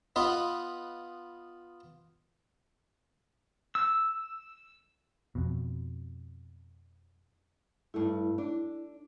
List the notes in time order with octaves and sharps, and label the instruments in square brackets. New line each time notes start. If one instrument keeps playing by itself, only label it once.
[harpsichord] B3 F4 B4 D#5
[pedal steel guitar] E6
[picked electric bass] F2 B2
[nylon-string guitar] G2 A3 [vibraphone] E4
[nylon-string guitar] D4